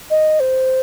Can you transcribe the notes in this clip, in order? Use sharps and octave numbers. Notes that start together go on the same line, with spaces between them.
D#5
C5